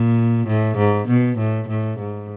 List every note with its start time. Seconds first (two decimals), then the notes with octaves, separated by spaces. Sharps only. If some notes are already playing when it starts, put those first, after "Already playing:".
Already playing: A#2
0.47 A2
0.77 G#2
1.08 B2
1.38 A2
1.68 A2
1.99 G#2